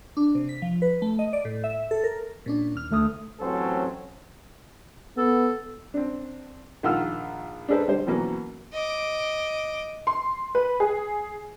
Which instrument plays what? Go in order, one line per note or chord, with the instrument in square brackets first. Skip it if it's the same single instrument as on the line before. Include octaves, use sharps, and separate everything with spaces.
[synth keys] D4
C3
B6
F3
B4
A3
D#5
D5
A2
E5
A4
A#4
[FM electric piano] A#2 C#4 D4
D#2 F6
[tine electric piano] D2 A3 D#6
[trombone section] A1 F#3 C4 C#4 A4 C5
[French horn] B3 [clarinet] A4
[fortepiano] C4 D4
A#1 D#3 F4 F#5 E6 F6
D4 G#4 A4 B4 C5
D3 G3 C5
B2 E3 F#3 A#3 C#4
[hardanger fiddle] D#5 D6
[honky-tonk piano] C6
B4
G#4